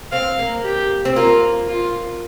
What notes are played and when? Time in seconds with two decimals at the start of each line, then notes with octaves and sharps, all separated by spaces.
0.12 C4 F5
0.39 A#3
0.65 G4
1.05 C4
1.16 A#3 F4
1.68 F4